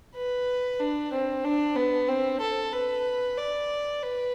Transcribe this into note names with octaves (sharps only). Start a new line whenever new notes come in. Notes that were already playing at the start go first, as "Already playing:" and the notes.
B4
D4
C4
D4
B3
C4
A4
B4
D5
B4